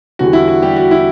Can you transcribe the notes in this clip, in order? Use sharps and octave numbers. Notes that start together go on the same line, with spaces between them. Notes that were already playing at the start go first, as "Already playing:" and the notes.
E2 D3 G3 F#4
E4
F#4
G3 G4
F#4
E4